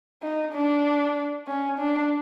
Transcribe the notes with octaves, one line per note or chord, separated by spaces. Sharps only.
D#4
D4
C#4
D4